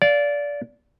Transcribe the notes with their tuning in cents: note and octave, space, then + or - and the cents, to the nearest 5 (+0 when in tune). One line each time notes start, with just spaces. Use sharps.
D5 -20 F5 +0